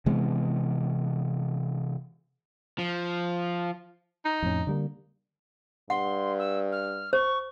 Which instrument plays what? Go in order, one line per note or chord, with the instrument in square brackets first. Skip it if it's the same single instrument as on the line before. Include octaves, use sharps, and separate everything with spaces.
[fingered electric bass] C3 E3 G#3 B3
[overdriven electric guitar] F3
[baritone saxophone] D#4
[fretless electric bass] F2 A2 C#4
D3 G3 A#3
[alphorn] G2 [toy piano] F#5 [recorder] C6
[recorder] E6
F6
[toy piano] C5 [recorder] C#6